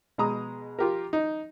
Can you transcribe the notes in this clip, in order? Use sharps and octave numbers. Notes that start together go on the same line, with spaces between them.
B2 G#3 A#5 D#6
F4 G4 A#4
D#4